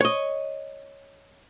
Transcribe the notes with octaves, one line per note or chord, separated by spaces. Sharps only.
C#5 D#5